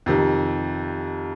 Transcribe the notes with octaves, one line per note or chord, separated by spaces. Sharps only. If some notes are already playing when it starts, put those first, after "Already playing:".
F2 C3 D#3